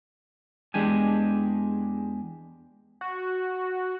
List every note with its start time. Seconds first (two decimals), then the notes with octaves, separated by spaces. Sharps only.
0.74 E2 G#3 D4 G4 G#5
3.01 F#4